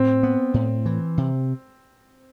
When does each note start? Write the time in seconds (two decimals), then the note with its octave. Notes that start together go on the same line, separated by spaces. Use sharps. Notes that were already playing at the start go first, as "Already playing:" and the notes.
Already playing: A2 C4
0.23 B3
0.54 A2
0.86 E3
1.18 C3